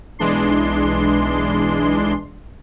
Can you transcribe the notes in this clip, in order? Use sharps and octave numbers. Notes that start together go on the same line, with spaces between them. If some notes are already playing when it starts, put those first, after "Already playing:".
B1 E3 G#3 D4 C6